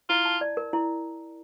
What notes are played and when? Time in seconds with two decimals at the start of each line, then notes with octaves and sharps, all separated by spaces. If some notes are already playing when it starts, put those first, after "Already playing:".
0.09 E4 F4
0.25 A5
0.41 D5
0.57 A#4
0.73 E4